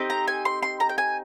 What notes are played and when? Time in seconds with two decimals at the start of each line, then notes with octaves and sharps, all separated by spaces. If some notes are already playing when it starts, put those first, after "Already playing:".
Already playing: C4 D#4 G4
0.10 A#5
0.28 G#5
0.45 C6
0.62 C6
0.80 A#5
0.89 G5
0.98 G#5